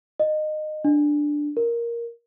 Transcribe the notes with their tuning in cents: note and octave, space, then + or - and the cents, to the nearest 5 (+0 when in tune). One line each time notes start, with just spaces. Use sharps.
D#5 -20
D4 +5
A#4 +5